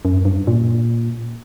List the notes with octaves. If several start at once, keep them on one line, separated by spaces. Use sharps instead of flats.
F#2
G2
A#2